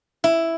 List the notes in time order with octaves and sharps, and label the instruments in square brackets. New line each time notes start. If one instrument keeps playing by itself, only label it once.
[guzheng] E4